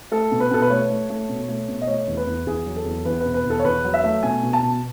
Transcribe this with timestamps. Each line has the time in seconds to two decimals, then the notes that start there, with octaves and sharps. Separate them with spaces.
0.11 A3 A4
0.31 B2
0.40 B4
0.51 B2 A4
0.62 B4
0.70 A3 C#5
0.90 A3
1.10 A3
1.29 B2
1.49 A3
1.68 B2
1.81 D#5
1.87 A3 C#5
2.07 E2
2.17 B4
2.27 E2
2.47 E2 G#4
2.66 F#3
2.76 A4
2.85 E2
3.05 E2 B4
3.20 B2 B4
3.34 B4
3.45 E2
3.50 A4
3.59 C#5
3.65 E2 B4
3.84 F#3
3.94 E5
4.03 A3
4.23 B2 G#5
4.43 B2
4.53 A5
4.62 B2